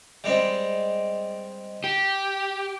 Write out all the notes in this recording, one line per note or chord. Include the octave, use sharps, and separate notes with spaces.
G3 G#3 C4
G4